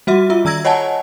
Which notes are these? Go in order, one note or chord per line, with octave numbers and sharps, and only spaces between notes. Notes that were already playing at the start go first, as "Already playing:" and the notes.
G3 F#4 E5
F4 E5
D#3 A#5 E6 G#6 A#6
C#5 D#5 F#5 G#5 A5